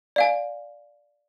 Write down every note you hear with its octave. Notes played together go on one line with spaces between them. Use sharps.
D5 F5 G#5